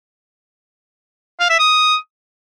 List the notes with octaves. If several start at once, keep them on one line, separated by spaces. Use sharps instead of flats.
F5
E5
D#6